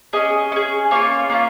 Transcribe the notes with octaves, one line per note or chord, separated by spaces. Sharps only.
C#4 G#4 D#5
C#4 G#4
A#3 C#4 F4 C#5
A#3 C#4 F4